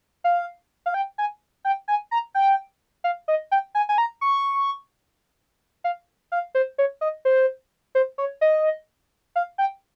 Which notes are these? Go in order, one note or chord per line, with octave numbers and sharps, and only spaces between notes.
F5
F5
G5
G#5
G5
G#5
A#5
G5
F5
D#5
G5
G#5
G#5
A#5
C#6
F5
F5
C5
C#5
D#5
C5
C5
C#5
D#5
F5
G5